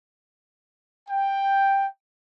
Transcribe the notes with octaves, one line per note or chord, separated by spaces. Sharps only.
G5